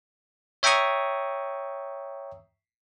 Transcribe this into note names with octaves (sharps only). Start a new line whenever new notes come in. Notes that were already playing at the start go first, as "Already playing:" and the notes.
C#5 E5 G5 A#5 C#6 D#6